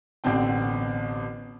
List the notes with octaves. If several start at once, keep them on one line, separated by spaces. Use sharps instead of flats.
A1 B2 D3 C4 G5